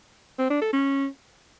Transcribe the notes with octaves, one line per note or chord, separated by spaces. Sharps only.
C4
D4
A4
C#4